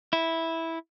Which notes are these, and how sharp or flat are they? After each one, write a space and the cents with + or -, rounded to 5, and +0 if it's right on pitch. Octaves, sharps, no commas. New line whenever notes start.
E4 -10